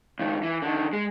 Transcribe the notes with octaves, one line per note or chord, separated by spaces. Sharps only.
C#2 D#3
E3
D3 D#3
G#3